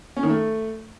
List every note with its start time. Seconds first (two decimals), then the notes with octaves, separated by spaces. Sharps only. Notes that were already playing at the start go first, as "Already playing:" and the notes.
0.17 C#4
0.23 D#3
0.29 A3